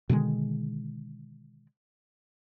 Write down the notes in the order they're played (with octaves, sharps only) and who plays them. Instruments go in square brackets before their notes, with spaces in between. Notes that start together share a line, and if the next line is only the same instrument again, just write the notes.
[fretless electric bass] B2 D3 D#3 G#3